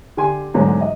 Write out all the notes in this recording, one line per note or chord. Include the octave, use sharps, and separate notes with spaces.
D3 G4 G#5 C6
E2 G#2 D3 D#3 F#3 A3
D#5